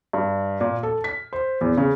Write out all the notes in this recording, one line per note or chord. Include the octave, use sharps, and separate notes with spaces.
G2
A#2
A4
B6
C5
E2
C#3